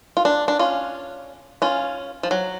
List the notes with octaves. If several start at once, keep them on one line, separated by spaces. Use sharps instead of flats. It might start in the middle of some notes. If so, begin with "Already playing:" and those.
F4
D4
D4
C#4 F4
C#4 F4
F3
F#3